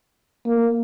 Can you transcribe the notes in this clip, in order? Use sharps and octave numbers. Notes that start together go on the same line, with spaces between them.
A#3